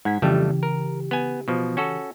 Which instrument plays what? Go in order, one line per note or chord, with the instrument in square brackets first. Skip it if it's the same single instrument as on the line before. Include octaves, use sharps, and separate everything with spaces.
[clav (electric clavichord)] G#2 [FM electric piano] F#5 G#6 B6
[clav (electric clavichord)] F2 G3 A3 [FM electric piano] C#3 E3 G4
[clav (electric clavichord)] A#4
B3 G#5
B2 F3
C#4 F#4 A4